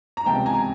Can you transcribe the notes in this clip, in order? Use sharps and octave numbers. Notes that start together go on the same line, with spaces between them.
A#5
C#2 C3 E3 G#3 B3 G5 A5
G#5 A#5